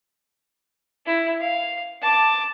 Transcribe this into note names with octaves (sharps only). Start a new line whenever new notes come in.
E4
F5
A5 D6